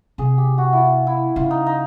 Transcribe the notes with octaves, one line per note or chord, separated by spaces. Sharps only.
C3 G#4
G4
F#4
E4 F4
E4
C#3 F4
D#4
D#4